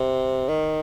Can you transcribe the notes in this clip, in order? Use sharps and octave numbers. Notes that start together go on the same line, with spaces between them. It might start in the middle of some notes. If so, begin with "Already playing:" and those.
Already playing: C3
D#3